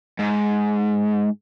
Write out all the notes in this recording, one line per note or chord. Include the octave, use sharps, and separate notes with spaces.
G#2